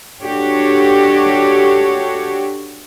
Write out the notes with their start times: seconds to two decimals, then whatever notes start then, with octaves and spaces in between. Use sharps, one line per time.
0.23 D4 F#4 G4 A4 C#5